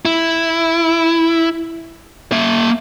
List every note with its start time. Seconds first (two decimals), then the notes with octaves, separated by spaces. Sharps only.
0.05 E4
2.32 A#3 E5